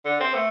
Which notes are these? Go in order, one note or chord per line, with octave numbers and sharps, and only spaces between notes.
D3
C4
A3